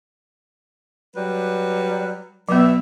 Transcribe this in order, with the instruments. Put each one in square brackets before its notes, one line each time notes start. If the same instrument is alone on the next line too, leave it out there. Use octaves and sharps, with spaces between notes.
[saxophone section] F#3 G3 B4
[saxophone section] B2 E5 [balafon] F#3 B3